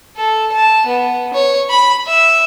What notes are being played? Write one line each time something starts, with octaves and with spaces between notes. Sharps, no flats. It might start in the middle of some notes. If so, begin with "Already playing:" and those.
A4
A5
B3
C#5
B5
E5